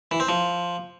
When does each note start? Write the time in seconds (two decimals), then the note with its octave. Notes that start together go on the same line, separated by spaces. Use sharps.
0.11 E3
0.20 C4
0.29 F3